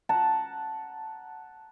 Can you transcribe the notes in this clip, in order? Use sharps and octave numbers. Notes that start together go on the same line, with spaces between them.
F#5 A5 A#5